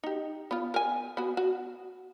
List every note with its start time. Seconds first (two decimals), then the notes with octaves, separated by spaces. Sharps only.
0.04 D#4 G4
0.51 B3 F4
0.74 A#4 G#5
1.17 B3 F#4
1.37 F#4